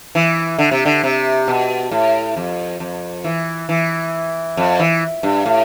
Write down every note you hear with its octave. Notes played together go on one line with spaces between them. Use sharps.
E3
D3
C3
D3
C3
B2
A2
F2
F2
E3
E3
F2
E3
G2
A2